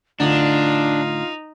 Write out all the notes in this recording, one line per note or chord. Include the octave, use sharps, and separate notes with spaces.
A2 D3 D4 D#4 F4